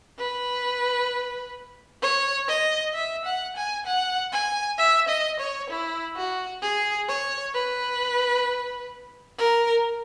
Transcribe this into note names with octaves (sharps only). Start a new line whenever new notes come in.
B4
C#5
D#5
E5
F#5
G#5
F#5
G#5
E5
D#5
C#5
E4
F#4
G#4
C#5
B4
A#4